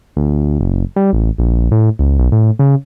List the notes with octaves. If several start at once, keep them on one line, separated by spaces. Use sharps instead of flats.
D2
F#1
G3
A1
A#1
A2
C#2
B1
A2
C#3